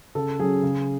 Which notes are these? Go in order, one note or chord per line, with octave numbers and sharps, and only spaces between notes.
C#3 A4
F#3 C#4 G#4
C#3